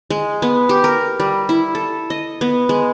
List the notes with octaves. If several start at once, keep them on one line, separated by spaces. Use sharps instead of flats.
G#3
B3
G4
A#4
G3
E4
A4
D#5
B3
G#3